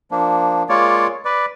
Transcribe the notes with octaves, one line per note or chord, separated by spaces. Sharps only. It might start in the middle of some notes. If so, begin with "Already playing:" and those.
F3 A#3 D4
G#3 A#3 F4 C#5 D5
B4 D5